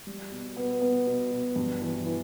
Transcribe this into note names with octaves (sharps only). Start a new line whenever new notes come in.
G3
B2
B3
B3
B2
B2
G2
E3
E3